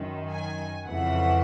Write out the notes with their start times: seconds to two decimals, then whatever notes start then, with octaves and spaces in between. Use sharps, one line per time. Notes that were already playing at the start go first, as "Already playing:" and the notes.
Already playing: F#2 D#3
0.30 G#5
0.86 F2 C#3 E3 F#5